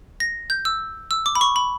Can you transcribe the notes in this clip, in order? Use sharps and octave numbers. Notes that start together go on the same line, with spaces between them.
A#6
G6
E6
E6
D6
B5
C#6
B5